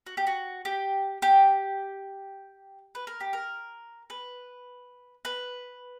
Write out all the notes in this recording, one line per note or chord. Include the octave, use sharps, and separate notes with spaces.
F#4
G4
F#4
G4
G4
B4
A#4
G4
A#4
B4
B4